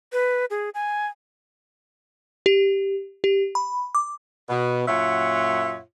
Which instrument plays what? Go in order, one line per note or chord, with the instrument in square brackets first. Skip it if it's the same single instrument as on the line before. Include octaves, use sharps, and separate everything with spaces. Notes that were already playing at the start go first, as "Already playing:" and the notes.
[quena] B4
G#4
G#5
[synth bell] G4
G4
B5
D6
[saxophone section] B2
F#2 A#2 F4 C#5 E5 F#5